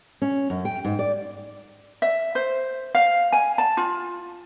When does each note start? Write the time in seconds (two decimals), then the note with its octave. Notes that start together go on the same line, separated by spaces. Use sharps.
0.22 C#4
0.50 F#2
0.65 G5
0.85 G#2
0.99 D5
2.02 E5
2.35 C5
2.95 F5
3.33 G#5
3.58 A5
3.77 F4